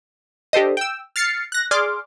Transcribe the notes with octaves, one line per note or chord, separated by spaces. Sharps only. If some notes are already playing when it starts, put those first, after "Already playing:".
D4 G4 A4 C5 D#5
G5 E6
F6 A6 C7 C#7
F#6 A#6
G#4 D5 C6 D6 F6